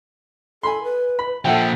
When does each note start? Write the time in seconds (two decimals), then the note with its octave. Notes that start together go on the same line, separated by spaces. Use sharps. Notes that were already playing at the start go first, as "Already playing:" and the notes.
0.63 A4 G#5 B5 C6
0.83 B4
1.19 B5
1.45 A#2 F3 A4 E5 F#5 G5